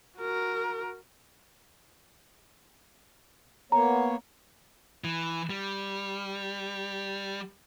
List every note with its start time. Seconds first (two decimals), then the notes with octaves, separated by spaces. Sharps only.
0.19 F#4 A#4
3.72 A#3 B3 C#5 A#5
5.04 E3
5.50 G3